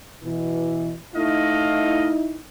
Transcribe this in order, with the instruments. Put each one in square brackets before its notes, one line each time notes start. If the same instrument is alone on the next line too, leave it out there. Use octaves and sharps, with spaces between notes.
[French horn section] B2 E3
[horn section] A3 D#5 F5 [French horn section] D#4 E4